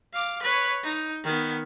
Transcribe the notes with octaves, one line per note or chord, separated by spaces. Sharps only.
F5 D6
B4 C#5
D#4
D#3 B3